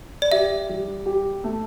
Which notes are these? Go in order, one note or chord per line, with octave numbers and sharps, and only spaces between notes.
D5
G4 E5
G3
G4
A3